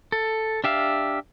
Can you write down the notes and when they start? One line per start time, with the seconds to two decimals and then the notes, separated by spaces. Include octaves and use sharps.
0.12 A4
0.64 D4 G4 E5 F5